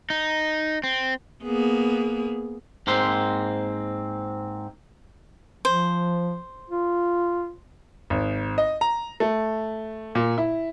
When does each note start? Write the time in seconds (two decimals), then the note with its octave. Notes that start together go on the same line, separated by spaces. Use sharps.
0.10 D#4
0.84 C4
1.43 A#3 B3 G#4
2.87 G#2 A#3 C4 C5
5.65 F3 C5
6.70 F4
8.10 G#1
8.58 D#5
8.81 A#5
9.20 A3
10.15 A#2
10.38 E4